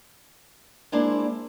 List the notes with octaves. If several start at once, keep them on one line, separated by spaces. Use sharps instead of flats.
G#3 A#3 D4 E4 C5